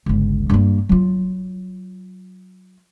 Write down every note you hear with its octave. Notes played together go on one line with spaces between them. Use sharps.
G1 C#2
G2 A#3
F#3 F4